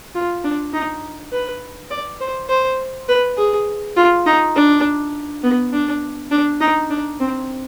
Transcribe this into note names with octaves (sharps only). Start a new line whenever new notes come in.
F4
D4
D#4
B4
D5
C5
C5
B4
G#4
F4
D#4
D4
B3
D4
D4
D#4
D4
C4